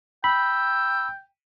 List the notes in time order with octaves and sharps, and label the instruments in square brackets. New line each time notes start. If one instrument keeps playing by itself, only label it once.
[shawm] G5 [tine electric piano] B5 [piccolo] E6